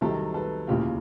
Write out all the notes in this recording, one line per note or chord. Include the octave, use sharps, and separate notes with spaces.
C2 C3 D#3 F#3 G4 A4
A4 B4
F1 D#2 C#3 E3 F4 G4